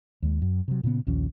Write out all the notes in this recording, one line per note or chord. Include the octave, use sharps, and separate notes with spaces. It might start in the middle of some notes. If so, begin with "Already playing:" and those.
D#2 G#3
F#2
C3 F#3
A#2 C#3 A#3 B3
A#1 D#2 F3 C#4